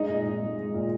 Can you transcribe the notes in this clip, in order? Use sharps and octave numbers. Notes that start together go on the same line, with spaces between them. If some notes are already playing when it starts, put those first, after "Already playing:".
Already playing: G#3 D#4 D#5
A#2
A#2
G#3
G#3
A#2